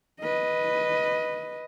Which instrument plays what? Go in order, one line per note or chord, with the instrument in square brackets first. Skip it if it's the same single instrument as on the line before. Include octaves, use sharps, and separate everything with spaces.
[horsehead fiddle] B4 D#5